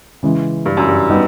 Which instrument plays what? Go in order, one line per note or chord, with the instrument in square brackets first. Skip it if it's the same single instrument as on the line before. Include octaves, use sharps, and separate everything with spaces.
[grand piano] C#3 E3 G#3
[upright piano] G2
F#2
G2
[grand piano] G3 B3 D#4